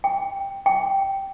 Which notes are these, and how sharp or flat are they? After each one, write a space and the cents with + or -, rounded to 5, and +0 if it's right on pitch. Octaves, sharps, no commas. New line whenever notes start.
G5 +0
G5 -10